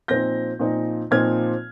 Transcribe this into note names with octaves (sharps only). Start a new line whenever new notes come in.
A#2 F3 C4 D#4 G6 A#6
A#2 F3 C4 D#4
A#2 F3 C4 D#4 F6 G#6